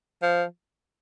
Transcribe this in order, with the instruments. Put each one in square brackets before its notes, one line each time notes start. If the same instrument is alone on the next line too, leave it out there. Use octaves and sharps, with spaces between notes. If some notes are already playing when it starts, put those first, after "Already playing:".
[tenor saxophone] F3